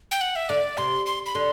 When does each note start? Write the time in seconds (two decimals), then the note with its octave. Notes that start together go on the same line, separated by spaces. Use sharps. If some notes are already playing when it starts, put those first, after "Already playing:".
0.11 G5
0.21 F#5
0.36 E5
0.49 D3 D5
0.77 C3 C6
1.06 C6
1.26 B5
1.35 D3 C6